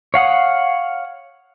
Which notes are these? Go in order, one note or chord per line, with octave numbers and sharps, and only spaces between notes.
C#5 F5 F#5 D#6